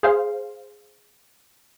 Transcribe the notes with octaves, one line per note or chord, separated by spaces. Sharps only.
G#4 C5 F5